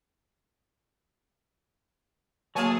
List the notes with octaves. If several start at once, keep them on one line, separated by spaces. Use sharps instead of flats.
D3 F#3 A3 A#3 G#4 C#5 G#5 A5